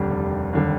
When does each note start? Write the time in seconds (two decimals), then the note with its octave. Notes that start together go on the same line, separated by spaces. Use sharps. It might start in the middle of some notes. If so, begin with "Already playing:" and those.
Already playing: F1 D#2 D3 G3
0.10 F1
0.53 D#2 D3 G3